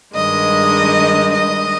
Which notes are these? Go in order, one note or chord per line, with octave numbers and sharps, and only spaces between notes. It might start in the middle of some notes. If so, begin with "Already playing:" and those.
G2 D#3 G#3 D#5
D#5